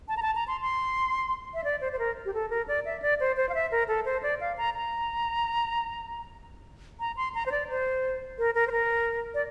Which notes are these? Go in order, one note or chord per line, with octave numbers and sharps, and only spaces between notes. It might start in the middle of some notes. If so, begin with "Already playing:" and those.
A5
A#5
A5
A#5
C6
C6
E5
D5
C5
C5
A#4
G4
A4
A#4
D5
E5
D5
C5
C5
F5
E5
A#4
A4
C5
D5
F5
A#5
A#5
A#5
C6
A#5
C5
D5
C5
A#4
A#4
C5
A#4
D5